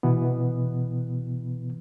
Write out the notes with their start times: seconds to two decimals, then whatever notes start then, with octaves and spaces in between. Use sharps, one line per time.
0.03 B2 E3 B3